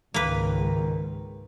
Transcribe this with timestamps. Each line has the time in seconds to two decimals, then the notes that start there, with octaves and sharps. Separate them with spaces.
0.14 C#2 G#2 D#3 A#3 B4